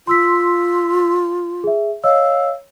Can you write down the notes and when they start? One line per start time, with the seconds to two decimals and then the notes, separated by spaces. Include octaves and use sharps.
0.07 F4 C6 E6 B6
1.64 G#4 E5
2.04 C#5 D#5 F5 E6